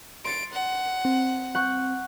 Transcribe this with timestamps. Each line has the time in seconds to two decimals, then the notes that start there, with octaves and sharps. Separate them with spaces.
0.25 C6 A6 C#7 D7
0.54 F#5
1.05 C4
1.55 F#5 C#6 G6